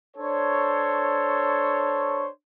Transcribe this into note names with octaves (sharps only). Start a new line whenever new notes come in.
D4 A4 C5 C#5